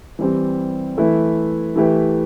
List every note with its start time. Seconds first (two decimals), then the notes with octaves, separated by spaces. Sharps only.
0.19 E3 G3 C4 G4
0.97 E3 A3 E4 B4
1.76 E3 A3 E4 G4 B4